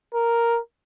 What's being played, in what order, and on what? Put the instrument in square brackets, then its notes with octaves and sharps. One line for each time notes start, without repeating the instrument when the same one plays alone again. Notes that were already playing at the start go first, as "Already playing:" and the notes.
[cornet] A#4